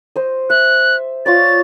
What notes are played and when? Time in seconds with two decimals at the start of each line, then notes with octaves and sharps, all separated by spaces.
0.16 C5 D#5
0.50 E5 F#6
1.26 F4 C#5 D5 A6